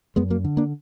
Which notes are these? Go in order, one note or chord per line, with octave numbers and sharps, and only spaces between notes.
F#2 G#3 B3
F#3 A#3
D3
A#3 D4